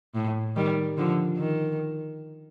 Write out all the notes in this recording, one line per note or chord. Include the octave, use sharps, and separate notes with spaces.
A2
D#3 G3
D3 F3
D#3